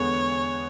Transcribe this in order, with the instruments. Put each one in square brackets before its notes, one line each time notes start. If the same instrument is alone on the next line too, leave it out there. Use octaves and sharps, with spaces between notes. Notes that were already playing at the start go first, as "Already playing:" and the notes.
Already playing: [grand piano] E2 D3 G#3 B3 [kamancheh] C#5